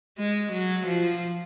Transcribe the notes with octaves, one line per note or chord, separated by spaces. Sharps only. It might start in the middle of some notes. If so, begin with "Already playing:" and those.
G#3
F#3
F3